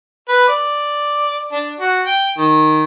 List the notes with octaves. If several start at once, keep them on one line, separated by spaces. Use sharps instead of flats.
B4
D5
D4
F#4
G5
D#3